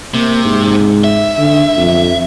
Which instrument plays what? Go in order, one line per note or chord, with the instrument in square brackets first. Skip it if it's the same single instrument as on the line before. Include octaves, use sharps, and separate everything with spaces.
[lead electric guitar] C3 [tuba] A#3
[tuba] G#2
[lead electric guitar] E5
[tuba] D3
F2